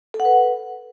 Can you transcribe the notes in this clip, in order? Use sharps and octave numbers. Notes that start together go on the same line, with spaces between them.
A4
F#5
B4